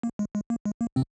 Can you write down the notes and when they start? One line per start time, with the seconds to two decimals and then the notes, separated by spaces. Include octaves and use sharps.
0.03 A#3
0.19 G#3
0.35 G#3
0.50 A#3
0.65 G#3
0.81 A#3
0.96 C3 C4